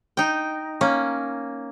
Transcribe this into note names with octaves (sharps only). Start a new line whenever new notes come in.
D#4 G5
A#3 C#4